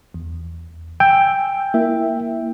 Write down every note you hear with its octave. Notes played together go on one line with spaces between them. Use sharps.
E2
G5 G#5 E6
A#3 E4 E5